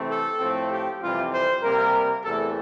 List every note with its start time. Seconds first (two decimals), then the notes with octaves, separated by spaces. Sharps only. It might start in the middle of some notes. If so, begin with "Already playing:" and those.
Already playing: C3 E3 A3 C4
0.09 A4
0.39 A2 F3 A3 C4
0.70 G4
1.01 F2 C3 E3 G3 C4 F4
1.33 C5
1.63 C3 G3 A#3 A#4
2.24 E2 C3 E3 A3 A4